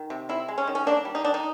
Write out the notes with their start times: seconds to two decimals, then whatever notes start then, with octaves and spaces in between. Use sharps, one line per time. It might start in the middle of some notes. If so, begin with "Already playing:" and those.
Already playing: D#3
0.10 C3
0.29 C4 E4
0.48 G#3
0.58 C#4
0.67 D#3
0.75 C#4
0.87 A#3 D4
1.05 G3
1.15 D#4
1.24 D#3 D4
1.34 D#4